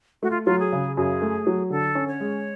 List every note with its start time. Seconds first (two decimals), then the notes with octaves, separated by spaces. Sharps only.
0.23 A3 F#4
0.31 F4
0.45 F#3 F4
0.59 G#4
0.73 C#3
0.97 F#2 G#4
1.22 A3
1.47 F#3
1.70 D3 A4
1.95 C#4
2.08 C#5
2.20 G#3